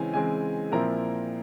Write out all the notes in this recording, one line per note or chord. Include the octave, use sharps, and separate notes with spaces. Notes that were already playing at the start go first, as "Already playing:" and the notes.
Already playing: C#3 E3 G#3 C4 G#5
C#3 E3 G#3 C4 G#5
A#2 F3 C4 E4 A#4 A#5